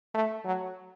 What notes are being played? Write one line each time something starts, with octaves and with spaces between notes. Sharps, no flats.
A3
F#3